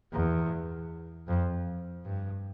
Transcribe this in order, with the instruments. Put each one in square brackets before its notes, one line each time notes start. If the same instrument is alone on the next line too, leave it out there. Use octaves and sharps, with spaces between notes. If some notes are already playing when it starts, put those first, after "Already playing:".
[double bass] E2
F2
G2